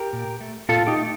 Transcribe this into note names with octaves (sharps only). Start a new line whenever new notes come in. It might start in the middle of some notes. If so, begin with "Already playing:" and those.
Already playing: G4 A#4
A#2
A3
A#2 F4 A4
D#4 G4
A3